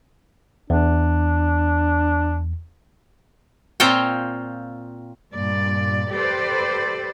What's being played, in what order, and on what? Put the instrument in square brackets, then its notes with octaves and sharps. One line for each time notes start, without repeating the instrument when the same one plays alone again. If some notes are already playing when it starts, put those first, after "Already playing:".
[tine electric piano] E2 [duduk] D4
[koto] A#2 C4 F4 C5 C#5 G5
[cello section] G2 A#2 D5
G4 A4 B4 C5 D5